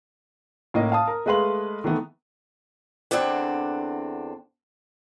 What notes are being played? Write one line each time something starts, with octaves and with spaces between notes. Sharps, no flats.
A2 A#3 C#4 D#5
F5 A5 D#6
A#4
G#3 A3 B4 F5 C6 F#7
D#3 E3 A3 B3
E2 D3 C4 D4 F#5